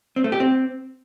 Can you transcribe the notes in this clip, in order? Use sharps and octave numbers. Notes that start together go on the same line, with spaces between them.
C4
A3
G4
C4